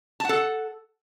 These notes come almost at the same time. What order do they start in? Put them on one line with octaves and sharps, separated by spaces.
A5 F#5 A4